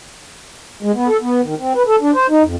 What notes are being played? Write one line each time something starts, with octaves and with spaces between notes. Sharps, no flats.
G#3
B3
A4
B3
D#3
C4
B4
A4
D4
C5
D#4
F2